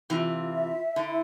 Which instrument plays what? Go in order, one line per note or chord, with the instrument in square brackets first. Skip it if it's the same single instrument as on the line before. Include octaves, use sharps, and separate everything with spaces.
[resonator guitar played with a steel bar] C3 E3 [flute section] F4
[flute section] E5
[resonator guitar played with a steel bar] D3 [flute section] E4